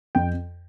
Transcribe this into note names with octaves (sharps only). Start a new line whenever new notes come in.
F2 G5